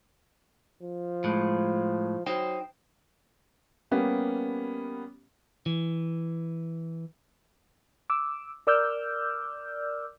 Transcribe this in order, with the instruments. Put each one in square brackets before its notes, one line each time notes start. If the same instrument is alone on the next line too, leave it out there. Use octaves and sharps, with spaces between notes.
[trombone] F3
[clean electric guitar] A2 G#3
[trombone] F#3 [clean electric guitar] D#4 C5 G5
[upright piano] G3 A#3 B3 C#4 G4
[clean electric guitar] E3
[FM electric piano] D6 E6
A#4 D5 D6 E6 F6 G6